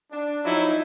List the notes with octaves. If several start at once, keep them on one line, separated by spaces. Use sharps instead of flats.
D4
F3 F#3 D#4 E4